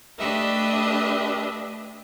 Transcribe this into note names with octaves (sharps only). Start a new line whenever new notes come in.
A3 D4 G4 B4 D#5 E5